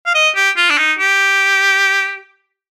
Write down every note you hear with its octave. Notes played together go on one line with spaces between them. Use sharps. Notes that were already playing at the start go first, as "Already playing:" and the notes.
F5
D#5
G4
F4
D4
D#4
G4